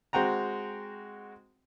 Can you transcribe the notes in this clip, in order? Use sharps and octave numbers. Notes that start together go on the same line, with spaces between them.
G#3 C4 F#4 G5 A#5